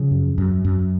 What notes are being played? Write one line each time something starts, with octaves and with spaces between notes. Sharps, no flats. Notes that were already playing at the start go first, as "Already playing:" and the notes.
Already playing: C#3 F3
F#2
F#2
F#2